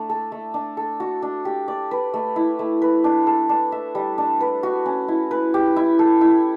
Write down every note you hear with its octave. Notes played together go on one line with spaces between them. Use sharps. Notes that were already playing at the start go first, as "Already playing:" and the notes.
Already playing: A3 D4
A4
A3
D4
A4
F#4
D4
G4
D5
B4
A3
E4
A3
B4
D4
A4
D4
E5
G3
D4
B4
F#4
C#4
E4
B4
G4
E4
A4
E4